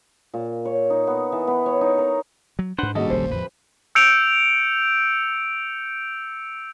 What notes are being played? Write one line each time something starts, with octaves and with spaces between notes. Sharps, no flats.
A#2
C#5
D#4
B3
E3
B3
C#5
D#4
A#4
F#3
G#2 D4 B4 C5 F#5
D#3 G3 A#3 C#4 F#4 G#4 A4 D#5
F1 A#1 D3 C5
E2 A2 F3 B4
E6 G6 C#7 D7 F7